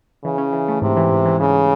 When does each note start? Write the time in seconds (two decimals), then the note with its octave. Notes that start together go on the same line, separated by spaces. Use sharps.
0.24 C#3 E3
0.38 C#4
0.53 E3
0.68 A3
0.82 G#2 C3
0.97 E3
1.12 G#2
1.26 E3
1.40 C#3 E3